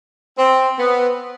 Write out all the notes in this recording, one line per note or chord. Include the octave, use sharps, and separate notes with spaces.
C4
B3